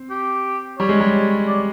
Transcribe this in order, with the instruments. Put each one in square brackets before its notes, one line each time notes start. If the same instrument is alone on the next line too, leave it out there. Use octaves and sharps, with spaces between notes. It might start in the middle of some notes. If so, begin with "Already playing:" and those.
Already playing: [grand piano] C4
[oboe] G4
[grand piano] G3 [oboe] C#5
[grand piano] G#3
G3
[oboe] D5